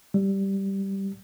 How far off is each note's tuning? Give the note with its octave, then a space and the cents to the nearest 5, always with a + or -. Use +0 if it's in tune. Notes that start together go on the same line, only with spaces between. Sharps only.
G3 -5